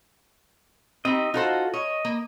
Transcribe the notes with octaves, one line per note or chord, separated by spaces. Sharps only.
C4 D#4 G4 D#5
D#4 F4 F#4 A4 C5
C#5 D#5
A#3